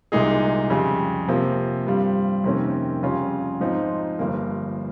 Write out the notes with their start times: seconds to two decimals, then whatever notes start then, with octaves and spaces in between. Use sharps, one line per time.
0.12 C2 A#2 G#3 D#4 G#4
0.70 F2 C#3 G3
1.28 C3 F3 A#3
1.87 G2 G3 C4 F4
2.44 F2 C3 D#3 A#3 C#4
3.03 F2 C#3 G3 C#4 F4
3.60 G#2 F3 C4 D#4
4.19 G1 G2 F3 A#3